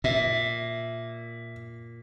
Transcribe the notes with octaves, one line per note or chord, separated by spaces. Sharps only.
A#2 E5